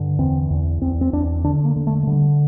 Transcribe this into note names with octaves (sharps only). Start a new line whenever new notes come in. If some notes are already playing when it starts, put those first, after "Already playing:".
Already playing: G2 D3
E2 C4
E2
E2 C4
C4
E2 D4
D3 D4
A#3
D3
A3
A3
D3 G3